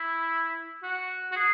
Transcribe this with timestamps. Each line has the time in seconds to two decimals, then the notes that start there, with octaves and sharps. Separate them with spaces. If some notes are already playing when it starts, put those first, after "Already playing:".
Already playing: E4
0.83 F#4
1.32 F#4
1.36 G#4